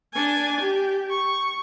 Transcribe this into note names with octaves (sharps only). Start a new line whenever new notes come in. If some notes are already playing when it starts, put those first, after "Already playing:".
D4 G#5
G4
C#6